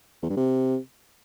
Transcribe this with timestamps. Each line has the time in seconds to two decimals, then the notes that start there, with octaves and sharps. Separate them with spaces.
0.22 E2
0.30 G2
0.37 C3